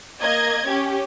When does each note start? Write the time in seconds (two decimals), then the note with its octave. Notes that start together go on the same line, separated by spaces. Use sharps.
0.21 A#3 D#5 G#6
0.67 C#4 G4